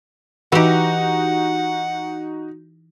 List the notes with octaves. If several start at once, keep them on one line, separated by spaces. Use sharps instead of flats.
E3 D#4 F#4 G4 F#5